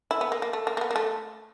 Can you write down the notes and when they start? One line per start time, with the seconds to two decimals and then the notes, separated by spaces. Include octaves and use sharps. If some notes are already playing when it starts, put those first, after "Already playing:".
0.11 E4
0.21 B3
0.32 A#3
0.42 A#3
0.53 A3
0.67 A#3
0.77 A#3
0.81 B3
0.91 A#3
0.96 A3